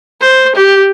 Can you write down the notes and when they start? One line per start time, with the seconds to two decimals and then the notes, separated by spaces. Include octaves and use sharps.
0.21 C5
0.55 G4